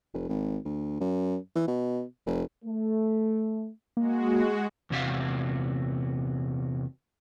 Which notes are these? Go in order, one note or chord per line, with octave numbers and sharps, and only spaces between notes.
F1
G#1
D2
F#2
E3
B2
F1
A3
G#3 A#3 F#4
E2 C3 F#4 E5 F5